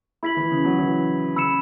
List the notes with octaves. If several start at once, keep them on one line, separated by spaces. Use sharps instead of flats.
E4 B5 G#6 B6 F#7
E3
C#3
F#3
E3
C#3 B5 E6 C#7 E7